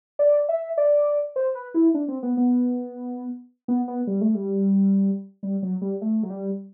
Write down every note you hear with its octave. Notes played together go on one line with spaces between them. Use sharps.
D5
E5
D5
C5
B4
E4
D4
C4
B3
B3
B3
B3
G3
A3
G3
G3
F#3
G3
A3
F#3
G3